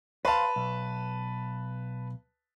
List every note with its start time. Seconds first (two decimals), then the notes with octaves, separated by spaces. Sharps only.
0.25 B4 C5 F5 A5
0.56 B1